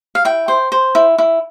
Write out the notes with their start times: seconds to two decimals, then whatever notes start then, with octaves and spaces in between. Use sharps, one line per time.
0.15 F5
0.25 E4 G5
0.48 C5
0.72 C5
0.95 E4
1.18 E4